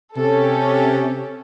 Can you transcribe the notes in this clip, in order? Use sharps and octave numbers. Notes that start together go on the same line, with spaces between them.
C3 C#4 G4 A4